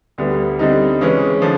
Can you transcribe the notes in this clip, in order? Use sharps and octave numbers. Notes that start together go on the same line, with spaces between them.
D2 D3 G3 B3
D3 G3 C4 D#4
C#3 E3 G#3 C#4
D3 F3